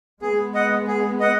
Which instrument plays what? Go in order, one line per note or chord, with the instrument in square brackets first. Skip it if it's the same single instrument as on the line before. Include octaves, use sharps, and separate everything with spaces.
[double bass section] G#3 B3 [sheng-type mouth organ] G#4
[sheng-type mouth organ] D#5 F#5
G#4
D#5 F#5